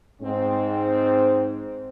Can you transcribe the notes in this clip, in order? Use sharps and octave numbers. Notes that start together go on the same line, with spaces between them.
G#2 C4